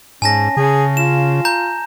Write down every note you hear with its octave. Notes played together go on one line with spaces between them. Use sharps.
G#2 C#4 G#5 A5 A#6
C#3 G#4
F4 E7
A#5 G6